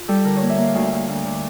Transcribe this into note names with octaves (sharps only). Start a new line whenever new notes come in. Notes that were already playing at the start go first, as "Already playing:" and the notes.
Already playing: F4
G3 A4
D3 A#4
A#3 C#5
E5
A#3 F5
D2 F5
E5
D2 F5
D2
D3